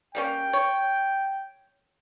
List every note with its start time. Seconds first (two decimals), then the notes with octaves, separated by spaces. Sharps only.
0.15 G3 A#3 C#4 G5
0.53 C#5